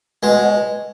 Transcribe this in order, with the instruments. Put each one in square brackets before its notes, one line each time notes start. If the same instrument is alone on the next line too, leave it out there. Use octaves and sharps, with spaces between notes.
[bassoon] B2 [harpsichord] G#3
[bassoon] B2